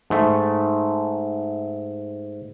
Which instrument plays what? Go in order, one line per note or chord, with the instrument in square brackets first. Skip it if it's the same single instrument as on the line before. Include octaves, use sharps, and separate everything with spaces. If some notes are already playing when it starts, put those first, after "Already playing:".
[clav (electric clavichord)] G#2 A3